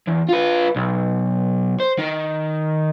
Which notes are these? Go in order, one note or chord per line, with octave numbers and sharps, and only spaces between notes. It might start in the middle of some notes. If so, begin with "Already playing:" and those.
E2
F4 B4
B1
C5
D#3